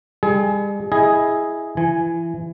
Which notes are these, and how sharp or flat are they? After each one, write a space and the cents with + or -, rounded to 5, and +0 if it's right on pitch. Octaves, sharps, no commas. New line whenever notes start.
G3 +45 G#4 +35
E4 +0 G#4 +0 D#5 +15
E3 +25 G#5 +0